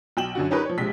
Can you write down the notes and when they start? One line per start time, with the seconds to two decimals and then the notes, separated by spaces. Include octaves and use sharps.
0.17 B1 G5 E7 F#7
0.35 F#2 D3 F#4
0.50 C#4 D#4 G4 A#4 B4 C#5
0.65 F3 C#5
0.78 A#1 C3 G#3 B6